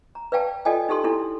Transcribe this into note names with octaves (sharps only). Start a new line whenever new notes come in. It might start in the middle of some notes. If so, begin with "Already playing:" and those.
A#5
B4 D5 F5 G5 A5
F4 A4 D5 D#5 G5 G#5
D#4 G4 A4 C6
D4 E4 A4